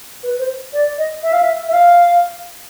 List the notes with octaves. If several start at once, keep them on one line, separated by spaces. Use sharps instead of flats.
B4
C5
D5
D#5
E5
F5
E5
E5
F5